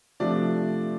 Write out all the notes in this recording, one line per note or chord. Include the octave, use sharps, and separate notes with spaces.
C3 F3 A3 D4 D5